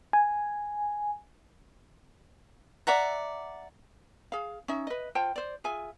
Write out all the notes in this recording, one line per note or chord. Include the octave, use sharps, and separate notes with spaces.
G#5
D5 E5 F#5 A#5
G#4 F5
C#4 D#4 E5
B4 D#5
F4 C5 G5 A5
C5 D5
F4 G#4 E5 G#5